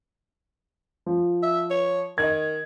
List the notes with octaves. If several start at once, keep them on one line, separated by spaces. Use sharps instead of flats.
F3
E5
C#5
D#3 D#5 G#6